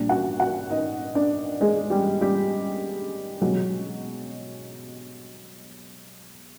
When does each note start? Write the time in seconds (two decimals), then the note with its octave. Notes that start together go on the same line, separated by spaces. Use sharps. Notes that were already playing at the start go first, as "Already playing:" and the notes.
Already playing: A#1 A#2 G3 D4
0.09 F#4 F#5
0.40 F#4 F#5
0.71 D#4 D#5
1.15 D4 D5
1.61 G#3 G#4
1.90 G3 G4
2.21 G3 G4
3.41 B2 F#3 G#3 F#4